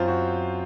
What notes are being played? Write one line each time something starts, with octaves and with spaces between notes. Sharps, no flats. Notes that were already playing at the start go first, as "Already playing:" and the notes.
Already playing: F#2 C4 F4 C5
F#4